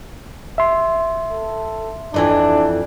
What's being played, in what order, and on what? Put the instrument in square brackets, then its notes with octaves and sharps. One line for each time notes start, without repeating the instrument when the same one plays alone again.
[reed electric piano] E5 C6
[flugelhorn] A4
[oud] F2 E3 D#4 [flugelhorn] D4